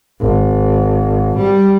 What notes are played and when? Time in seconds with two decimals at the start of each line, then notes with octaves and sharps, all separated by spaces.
0.21 G#1
1.38 G3